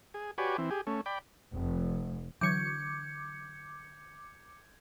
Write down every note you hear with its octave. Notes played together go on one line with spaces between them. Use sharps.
G#4
F#4 G4 B4 C#5 D5 G#5
E3 C4
G4 G#4
A3 C#4
D5 G5 B5
F1
D3 E3 F#3 C#6 D6 G6 G#6 C#7